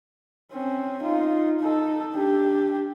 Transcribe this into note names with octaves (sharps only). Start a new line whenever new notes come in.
C4 C#4
D#4 F4
D#4 A4
D4 G4